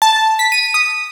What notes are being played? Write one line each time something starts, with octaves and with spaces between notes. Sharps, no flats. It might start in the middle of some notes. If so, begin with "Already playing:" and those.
A5
B6
D#7
D#6